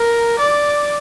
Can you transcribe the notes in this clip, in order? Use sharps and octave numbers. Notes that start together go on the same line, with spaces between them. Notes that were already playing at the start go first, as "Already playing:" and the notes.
Already playing: A#4
D5